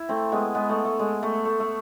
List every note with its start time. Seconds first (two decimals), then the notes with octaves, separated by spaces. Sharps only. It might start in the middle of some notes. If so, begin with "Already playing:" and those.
Already playing: E4
0.09 A3 C4
0.32 G#3 B3
0.55 G#3 B3
0.69 A3
0.85 A3
0.99 G#3
1.23 A3
1.45 A3
1.60 A3